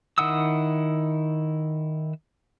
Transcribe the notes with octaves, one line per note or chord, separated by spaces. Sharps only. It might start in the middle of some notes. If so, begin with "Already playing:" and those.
D#3 E4 F#5 D#6 E6